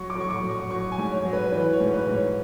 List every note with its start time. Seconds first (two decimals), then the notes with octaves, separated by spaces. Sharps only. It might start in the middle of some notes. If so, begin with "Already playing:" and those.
Already playing: F#3 C#6
0.10 D6
0.16 F#3
0.21 C#6
0.30 D6
0.43 F#3
0.51 C#6
0.71 F#3 C#6
0.92 G#5
0.98 G#2
1.12 C#5
1.25 F#3
1.33 B4
1.52 E3 B4
1.73 C#5
1.80 G#2
1.94 B4
2.08 G#2
2.14 C#5